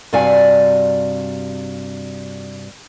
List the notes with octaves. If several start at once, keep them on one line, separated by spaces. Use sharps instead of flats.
G2 C3 F#4 D5 F5 G#5